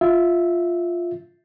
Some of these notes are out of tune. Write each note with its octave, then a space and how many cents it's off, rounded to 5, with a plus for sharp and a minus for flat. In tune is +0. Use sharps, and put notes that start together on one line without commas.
F4 +0 E5 -10